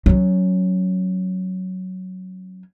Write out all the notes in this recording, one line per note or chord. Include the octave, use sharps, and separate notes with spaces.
F#3 C#4